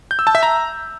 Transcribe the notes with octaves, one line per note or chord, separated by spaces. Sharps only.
G6
E6
A5
E5
A#5